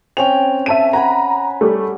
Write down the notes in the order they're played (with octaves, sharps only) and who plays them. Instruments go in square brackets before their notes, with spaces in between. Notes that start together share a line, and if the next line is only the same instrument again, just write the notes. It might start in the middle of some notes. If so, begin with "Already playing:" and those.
[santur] C4 C#4 G5 [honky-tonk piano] F7
[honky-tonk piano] E5 A5 D#7
[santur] F#5 G#5 B5 [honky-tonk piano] A#5
[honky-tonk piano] G3 A3